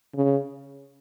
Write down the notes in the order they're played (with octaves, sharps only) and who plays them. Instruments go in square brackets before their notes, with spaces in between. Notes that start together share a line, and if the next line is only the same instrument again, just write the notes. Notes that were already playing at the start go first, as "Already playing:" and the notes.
[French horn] C#3